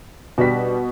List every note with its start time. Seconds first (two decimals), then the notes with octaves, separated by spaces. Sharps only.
0.38 B2 G3 D4 F#4 B6